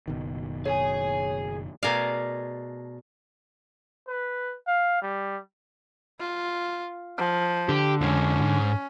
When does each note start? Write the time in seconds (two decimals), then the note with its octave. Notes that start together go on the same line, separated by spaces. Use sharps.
0.08 F#1 B2 D#3
0.65 G#4 C#5 G#5
1.83 B2 A3 G#4 A#4 D5 F5
4.08 B4
4.67 F5
5.02 G3
6.19 F4
7.18 F3
7.69 D3 G4
8.01 F2 G#3 C#4
8.42 G#2